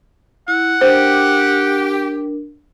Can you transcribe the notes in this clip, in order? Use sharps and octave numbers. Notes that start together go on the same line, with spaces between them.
E4 F#5
D4 G4 A#4 C5